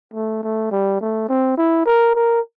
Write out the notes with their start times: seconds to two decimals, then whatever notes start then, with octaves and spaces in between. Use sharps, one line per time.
0.14 A3
0.43 A3
0.71 G3
1.01 A3
1.29 C4
1.58 E4
1.86 A#4
2.15 A#4